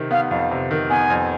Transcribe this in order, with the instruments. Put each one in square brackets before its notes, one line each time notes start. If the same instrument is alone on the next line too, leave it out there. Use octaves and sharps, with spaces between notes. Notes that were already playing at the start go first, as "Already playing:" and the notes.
Already playing: [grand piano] C3 D#3
[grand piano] B3 [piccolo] F5
[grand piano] F2 [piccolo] F5
[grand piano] C3
D#3
[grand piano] B3 [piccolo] G#5
[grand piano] F2